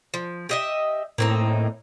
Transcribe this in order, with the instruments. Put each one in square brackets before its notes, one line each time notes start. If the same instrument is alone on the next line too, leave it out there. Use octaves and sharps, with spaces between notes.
[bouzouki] F3
G4 D#5 E5
[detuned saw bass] A2 [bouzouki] A#3 C4 D#4